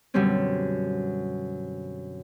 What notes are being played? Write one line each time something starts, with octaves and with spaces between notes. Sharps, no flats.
F#2 B2 D3 G3 C4 C#4